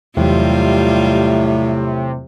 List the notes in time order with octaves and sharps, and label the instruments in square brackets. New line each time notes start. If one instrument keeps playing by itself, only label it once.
[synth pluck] E2 E3 F#3 [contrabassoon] A2 [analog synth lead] C3 [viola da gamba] G3 F4